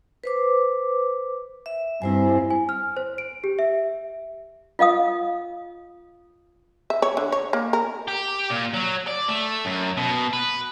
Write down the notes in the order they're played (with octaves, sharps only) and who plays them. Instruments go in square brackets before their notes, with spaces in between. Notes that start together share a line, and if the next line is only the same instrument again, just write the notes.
[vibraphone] B4 C5 D6
E5
[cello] G2 C4 [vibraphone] E4 C5 G#5
[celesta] G#5
F6
C5
D7
G4
E5
[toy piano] F4 D#5 F5 D#6
[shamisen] E5
C#5
D3
C#5
A#3
A#4
[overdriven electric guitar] G4
A#2
F#3
D5
A3
F#2
B2
B4